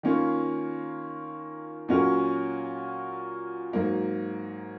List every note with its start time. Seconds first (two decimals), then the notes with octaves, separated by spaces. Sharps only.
0.03 D#3 A#3 C#4 F4
1.88 A#2 F#3 C#4 F#4 A#4
3.73 G#2 F#3 A#3